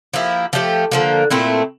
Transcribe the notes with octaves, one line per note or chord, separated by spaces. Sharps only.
F3 A#3 E4 G4
F3 A3 D4 G4
D3 F3 A#3
A#2 A3 C4 E4